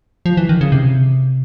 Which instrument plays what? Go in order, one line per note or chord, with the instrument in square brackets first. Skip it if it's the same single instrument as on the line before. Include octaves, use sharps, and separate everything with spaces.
[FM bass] F3
E3
D#3
C#3
C3